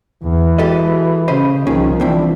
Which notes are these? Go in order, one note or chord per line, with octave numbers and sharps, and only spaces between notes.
E2 E3
G#3 F#4 G4 A4 D#5
C#3 C#4 C5 D#5 B5
C2 D#3 F3 C#4 F4 G#4
E3 C4 D4 E4